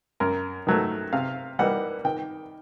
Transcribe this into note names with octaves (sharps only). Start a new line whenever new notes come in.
F#2 A#4
D#3 F#3 A3
C3 F5
E3 G3 A#3 D#4 F#5
D#3 G5